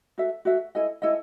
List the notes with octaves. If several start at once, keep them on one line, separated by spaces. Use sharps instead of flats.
F#4 A4 E5
F#4 A4 E5
E4 A4 D#5 G#5
E4 A4 D#5 G#5